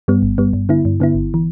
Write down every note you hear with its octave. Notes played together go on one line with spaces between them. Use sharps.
G2 G3 B3
G1
G2 G3 B3
G2
D3 B3 E4
G2
D3 B3 E4
G1
E3